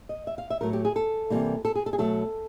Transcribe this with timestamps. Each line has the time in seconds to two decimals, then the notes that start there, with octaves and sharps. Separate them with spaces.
0.09 D#5
0.27 E5
0.38 F5
0.50 E5
0.61 A2 F#3 A3 A#4
0.73 G4
0.85 G#4
0.96 A4
1.30 C3 E3 G3 A#3
1.65 A4
1.75 G#4
1.86 A4
1.93 G#4
1.98 B2 F#3 A3 A4